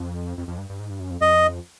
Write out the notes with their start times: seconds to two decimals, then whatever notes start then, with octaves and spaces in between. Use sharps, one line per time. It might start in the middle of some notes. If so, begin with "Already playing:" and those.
Already playing: F2
0.38 F2
0.48 F2
0.58 G2
0.69 G2
0.80 G#2
0.90 G2
1.00 F#2
1.10 F2
1.21 F2 D#5